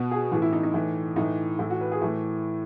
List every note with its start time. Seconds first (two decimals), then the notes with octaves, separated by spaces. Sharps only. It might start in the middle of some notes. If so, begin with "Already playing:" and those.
Already playing: B2 F#4
0.11 G#4
0.32 A2 E3
0.42 E4
0.53 D#4
0.63 D#4
0.74 A2 E3
1.16 A2 E3 D#4
1.59 A2 E3 E4
1.70 F#4
1.81 B4
1.92 G#4
2.01 A2 E3 A3